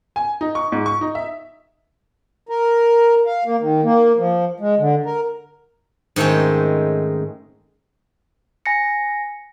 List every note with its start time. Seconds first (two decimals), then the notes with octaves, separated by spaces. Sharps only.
0.16 G#5
0.41 D#4
0.55 C#6
0.72 G#2
0.86 C#6
1.01 D#4
1.15 E5
2.49 A#4
3.26 F5
3.45 A#3
3.60 D#3
3.84 A#3
4.18 F3
4.60 G#3
4.79 D3
5.06 A#4
6.16 G#2 D#3 A3 C4 C#4
8.66 G#5 A#6 C#7